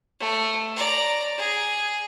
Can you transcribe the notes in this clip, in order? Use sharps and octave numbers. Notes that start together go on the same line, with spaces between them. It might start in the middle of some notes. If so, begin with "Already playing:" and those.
A3
D5 A#5
G#4